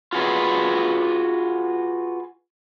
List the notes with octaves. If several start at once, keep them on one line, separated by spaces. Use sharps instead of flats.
F4 F#4 G#4 B4